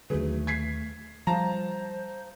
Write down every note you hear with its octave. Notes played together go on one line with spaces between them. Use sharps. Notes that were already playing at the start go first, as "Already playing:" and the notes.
D#2 D3 F#3 A3 G#4 B4
G#6 B6 C7
F3 G3 F4 C5 A5 A#5